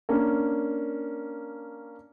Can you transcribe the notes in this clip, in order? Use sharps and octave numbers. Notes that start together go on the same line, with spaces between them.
A#3 C#4 D4